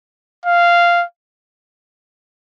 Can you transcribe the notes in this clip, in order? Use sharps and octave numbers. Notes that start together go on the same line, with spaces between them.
F5